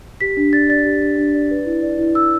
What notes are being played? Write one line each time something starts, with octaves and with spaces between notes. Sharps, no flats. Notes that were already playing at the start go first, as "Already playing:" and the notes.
G4 B6
D4
D5 A6
D5 A6
G4
D4
D4
D5
B4
E4
D5
E4
E4 E6